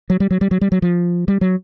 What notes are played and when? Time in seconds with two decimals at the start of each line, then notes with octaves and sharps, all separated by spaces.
0.10 F#3
0.20 G3
0.31 F#3
0.41 G3
0.51 F#3
0.61 G3
0.72 F#3
0.82 F3
1.28 G3
1.41 F#3